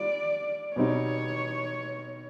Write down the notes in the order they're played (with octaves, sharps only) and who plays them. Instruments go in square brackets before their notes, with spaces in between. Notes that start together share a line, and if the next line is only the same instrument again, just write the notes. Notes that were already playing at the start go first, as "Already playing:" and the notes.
Already playing: [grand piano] G3 F4 [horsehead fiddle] D5
[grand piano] B2 G3 C4 D#4 [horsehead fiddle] C#5